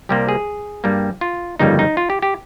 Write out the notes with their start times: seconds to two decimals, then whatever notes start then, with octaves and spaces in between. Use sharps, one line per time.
0.09 C2 C3 G3 A#3 G4
0.29 G#4
0.84 G2 G3 A#3
1.21 F4
1.59 G1 F2 C#3 G3 A#3 D#4
1.79 D#4
1.97 F4
2.10 G4
2.22 G4